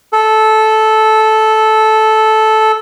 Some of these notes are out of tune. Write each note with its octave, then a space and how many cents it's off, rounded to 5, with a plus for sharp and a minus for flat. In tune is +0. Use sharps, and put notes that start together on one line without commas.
A4 -10